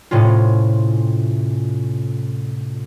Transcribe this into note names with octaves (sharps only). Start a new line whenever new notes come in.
A2 C3 C#4 F4